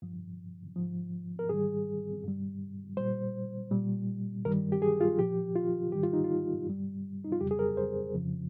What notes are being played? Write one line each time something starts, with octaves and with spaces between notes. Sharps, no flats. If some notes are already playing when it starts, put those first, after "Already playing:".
G2 F3
G#2 F3
A#4
G#2 D#3 G3 G#4
G2 G3
A#2 G3 C5
A#2 G3
G2 D#3 G3 A#4
G4
G#4
F4
A#2 F3 G4
F4
G#2 D#3 G3 G4
F4
D#4
F4
G2 G3
D#4
F4
F2 C#3 G3 G4
G#4
A#4
C5
F2 C#3 F3